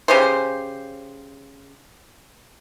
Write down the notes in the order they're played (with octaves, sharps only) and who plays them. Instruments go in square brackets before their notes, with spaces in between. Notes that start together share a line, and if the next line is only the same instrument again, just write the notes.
[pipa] C#3 G4 C5